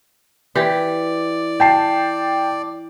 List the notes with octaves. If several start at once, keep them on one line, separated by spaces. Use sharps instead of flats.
E3 G4 D5
G5 A5 C7